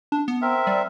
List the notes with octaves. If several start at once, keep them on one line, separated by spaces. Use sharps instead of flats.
D4
B3
C4 A#4 E5
G3